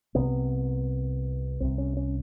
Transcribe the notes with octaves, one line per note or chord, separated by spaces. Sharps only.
C2 C3 B3
C2 C3 C4
C#4
C#4